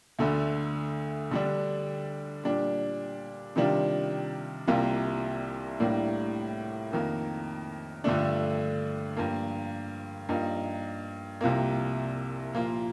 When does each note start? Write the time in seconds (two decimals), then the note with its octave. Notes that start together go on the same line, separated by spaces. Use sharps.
0.19 D2 D3 A3
1.31 D3 G3 D4
2.43 A#2 G3 D4
3.56 C3 D#3 G3 D4 F4
4.67 C2 C3 G3 A#3 F4
5.80 A2 G3 A#3 D4
6.92 F2 D#3 A#3
8.04 G2 D3 F3 A3 D4
9.17 G2 F3 A#3 F4
10.29 G2 F3 A#3 D#4
11.41 C2 C3 F3 A#3
12.53 A#2 F3 A#3 F4